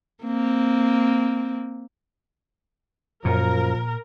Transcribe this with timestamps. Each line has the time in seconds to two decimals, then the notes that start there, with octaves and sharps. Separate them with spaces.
0.24 A#3 C4
3.25 F#2 A#2 F3 A#4